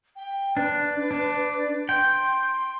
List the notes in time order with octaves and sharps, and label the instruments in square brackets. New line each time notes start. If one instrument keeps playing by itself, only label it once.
[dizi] G5
[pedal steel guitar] D4 [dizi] B4
[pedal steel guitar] D4
[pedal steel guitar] G5 [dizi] C6